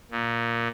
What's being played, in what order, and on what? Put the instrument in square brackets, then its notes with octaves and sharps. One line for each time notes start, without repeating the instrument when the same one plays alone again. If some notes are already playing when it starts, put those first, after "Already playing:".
[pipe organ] A#2